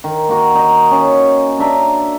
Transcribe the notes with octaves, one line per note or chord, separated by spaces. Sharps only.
D#3
A#3 F#4
D#4 D#5
C#4
D4 E5 A#5